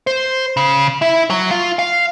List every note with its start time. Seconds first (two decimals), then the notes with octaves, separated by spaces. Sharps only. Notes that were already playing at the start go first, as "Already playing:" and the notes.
0.07 C5
0.57 C#3
1.02 E4
1.30 F#3
1.51 F4
1.79 F5